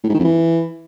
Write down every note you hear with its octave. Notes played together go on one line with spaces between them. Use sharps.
A2
G#2
D#3
F2
E3